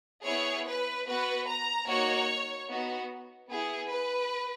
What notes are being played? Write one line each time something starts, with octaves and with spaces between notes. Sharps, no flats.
B3 E4 G#4 C#5
B4
B3 F#4 B4
A#5
A#3 D#4 F#4 C#5
B3 D#4 F#4
B3 E4 G#4
B4